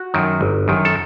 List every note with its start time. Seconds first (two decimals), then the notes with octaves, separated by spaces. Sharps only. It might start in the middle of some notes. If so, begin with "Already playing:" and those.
Already playing: F#4
0.14 F#2 D#3
0.41 G1
0.68 F#2 D#3
0.85 A4